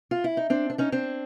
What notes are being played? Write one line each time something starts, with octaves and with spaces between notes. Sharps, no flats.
F4
E4
D#4
C4 D4
D4
C#4 D#4
C4 D4